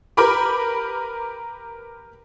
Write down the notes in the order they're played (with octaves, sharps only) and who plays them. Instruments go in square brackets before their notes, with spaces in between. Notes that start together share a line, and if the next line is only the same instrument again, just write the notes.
[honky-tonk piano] G4 A#4 B4 B5 D6